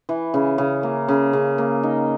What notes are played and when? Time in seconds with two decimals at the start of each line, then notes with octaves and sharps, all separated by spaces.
0.09 E3
0.34 C#3
0.58 C#3
0.83 A#3
1.08 C#3
1.33 C#3
1.58 A#3
1.83 D#4